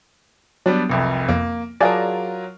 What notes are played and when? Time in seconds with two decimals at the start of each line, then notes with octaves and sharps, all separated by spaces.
0.66 F#3 G3 B3 D4
0.90 F1 C2 F2
1.29 F2 A#3
1.80 F#3 F4 G#4 A#4 D5 A5